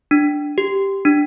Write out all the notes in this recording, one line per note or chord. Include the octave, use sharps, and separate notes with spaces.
D4
G4
D4